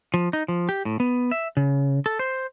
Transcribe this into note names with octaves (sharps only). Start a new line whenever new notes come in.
F3
D#4
F3
G4
A2
B3
E5
C#3
A4
C5